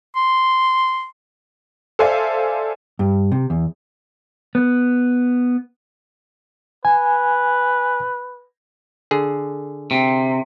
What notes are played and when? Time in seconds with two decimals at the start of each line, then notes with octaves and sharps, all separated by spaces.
0.16 C6
1.99 A4 C5 D5 E5 F5 G#5
2.99 G2
3.32 C3
3.50 E2
4.55 B3
6.85 B4 G#5
9.11 D3 G#4
9.91 C3